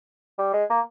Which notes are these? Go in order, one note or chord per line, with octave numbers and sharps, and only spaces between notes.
G3
G#3
A#3